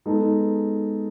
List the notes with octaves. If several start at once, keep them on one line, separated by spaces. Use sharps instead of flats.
G#3 B3 D#4 A4